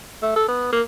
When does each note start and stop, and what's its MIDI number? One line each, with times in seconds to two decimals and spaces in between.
0.22 0.33 57
0.36 0.44 69
0.48 0.68 59
0.72 0.82 58